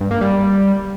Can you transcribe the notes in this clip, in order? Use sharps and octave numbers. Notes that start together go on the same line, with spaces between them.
G2
A#3
G3